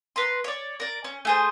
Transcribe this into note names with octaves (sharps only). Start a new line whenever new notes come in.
B4 A#5 C6
C#5 D5
A#4 D5
C#4
A3 G#4 C5